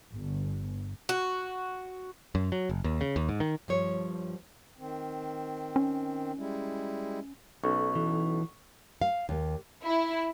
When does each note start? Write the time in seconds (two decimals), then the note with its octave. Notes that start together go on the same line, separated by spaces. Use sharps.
0.15 G1
1.09 F#4
2.35 F#2
2.52 F#3
2.69 F#1
2.84 D#2
3.01 C#3
3.16 D#2
3.29 G#2
3.40 D#3
3.68 G2 F3 C#5
4.78 D#3 C4
5.76 C#4
6.37 G3 G#3 E4
7.64 B1 C#4 A4 C#6
7.95 E3
9.02 F5
9.29 D#2
9.86 E4